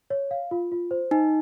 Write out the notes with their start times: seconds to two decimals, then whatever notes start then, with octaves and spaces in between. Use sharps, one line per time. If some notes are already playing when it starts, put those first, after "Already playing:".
0.10 C#5
0.31 F5
0.51 F4
0.72 F4
0.91 C5
1.11 D#4 G#5